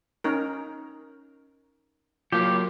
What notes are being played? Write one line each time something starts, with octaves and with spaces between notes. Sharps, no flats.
C#4 D#4 A#4
F#3 A#3 F4 G4